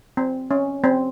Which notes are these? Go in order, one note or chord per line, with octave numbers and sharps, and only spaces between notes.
C4
C#4
C4